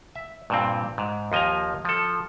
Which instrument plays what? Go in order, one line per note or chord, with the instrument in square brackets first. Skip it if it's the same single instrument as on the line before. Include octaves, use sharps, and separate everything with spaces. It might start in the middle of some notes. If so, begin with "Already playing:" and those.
[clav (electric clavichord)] E5
G2 A#2 C4
G#2
D#2 F3 D#5 G#5 A#5
F3 A4